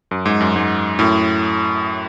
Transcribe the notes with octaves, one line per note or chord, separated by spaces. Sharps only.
F#2
G#2
F#2
G#2
F#2 A2